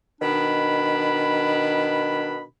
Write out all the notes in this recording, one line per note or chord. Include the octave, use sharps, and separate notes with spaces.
B2 D#3 D4 B5